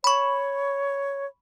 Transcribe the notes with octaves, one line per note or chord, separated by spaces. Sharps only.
C#5 B5 C#6